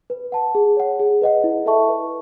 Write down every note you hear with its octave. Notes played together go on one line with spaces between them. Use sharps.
B4
F#5 A5
G#4
C#5 F#5
G#4
B4 D#5 F#5
E4
A4 E5 A5 C#6
B4